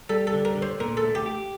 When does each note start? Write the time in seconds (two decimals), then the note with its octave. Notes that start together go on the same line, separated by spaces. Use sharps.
0.10 G3 A4
0.27 A4
0.33 D3
0.45 A#4
0.56 D3
0.62 C5
0.80 A#2 A#4
0.97 A4
1.03 A3
1.15 G4
1.26 G4